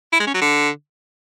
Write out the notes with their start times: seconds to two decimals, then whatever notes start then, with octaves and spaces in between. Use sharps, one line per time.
0.13 E4
0.20 G#3
0.27 C#4
0.34 F#3
0.41 D3